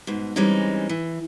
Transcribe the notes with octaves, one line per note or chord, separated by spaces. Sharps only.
G#2 B2
E3 G3 G#3 C4 C#4 D#4
E3